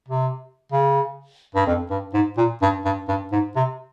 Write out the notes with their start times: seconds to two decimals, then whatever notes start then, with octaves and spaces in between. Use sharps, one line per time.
0.08 C3
0.72 C#3
1.55 G2
1.67 F2
1.90 G2
2.14 G#2
2.38 A#2
2.62 G2
2.85 G2
3.08 G2
3.32 G#2
3.56 C3